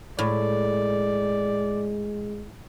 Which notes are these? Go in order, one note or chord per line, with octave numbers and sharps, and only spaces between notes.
A2 G#3 D5